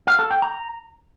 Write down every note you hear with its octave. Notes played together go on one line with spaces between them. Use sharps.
F5
A4
G5
A#5